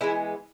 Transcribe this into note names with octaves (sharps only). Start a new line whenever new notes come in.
E3 G#3 B3 E4